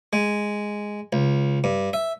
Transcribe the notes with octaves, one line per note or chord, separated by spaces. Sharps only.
G#3
C#2
G2
E5